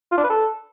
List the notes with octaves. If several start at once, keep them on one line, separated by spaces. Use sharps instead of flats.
F4
D4
B4
A4